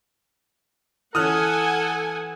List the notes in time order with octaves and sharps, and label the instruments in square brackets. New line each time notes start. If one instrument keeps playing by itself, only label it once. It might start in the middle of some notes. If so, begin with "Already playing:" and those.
[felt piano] E3 C#4 [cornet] A4 [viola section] F#5 G#5 [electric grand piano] D#6 F6 F#6